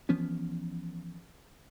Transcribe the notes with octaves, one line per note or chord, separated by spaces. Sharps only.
E3 F3 B3 C#4